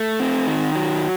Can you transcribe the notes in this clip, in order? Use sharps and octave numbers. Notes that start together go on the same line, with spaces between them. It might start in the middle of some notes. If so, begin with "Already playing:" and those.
Already playing: A3
C4
D#3
F#3